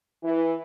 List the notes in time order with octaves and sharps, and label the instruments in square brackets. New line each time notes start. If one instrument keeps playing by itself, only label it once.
[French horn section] E3